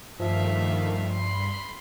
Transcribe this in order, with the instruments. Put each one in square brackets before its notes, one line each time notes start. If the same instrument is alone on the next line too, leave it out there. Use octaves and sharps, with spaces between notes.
[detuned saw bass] G2 [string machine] D#3 A3 [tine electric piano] F3 [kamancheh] E5 F5
[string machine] B5 [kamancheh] C6